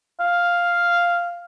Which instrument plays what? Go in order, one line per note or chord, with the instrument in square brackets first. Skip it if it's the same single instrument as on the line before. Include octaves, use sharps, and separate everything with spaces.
[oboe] F5